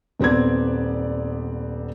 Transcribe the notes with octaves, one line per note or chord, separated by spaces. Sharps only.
D#1 B3 C4 D5 G#6